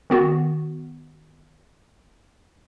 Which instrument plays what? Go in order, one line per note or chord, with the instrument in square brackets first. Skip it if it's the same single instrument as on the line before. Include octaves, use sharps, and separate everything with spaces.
[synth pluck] D#3 B3 F#4